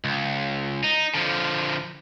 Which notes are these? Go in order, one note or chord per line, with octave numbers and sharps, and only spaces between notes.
C#2
D#4
D3 F3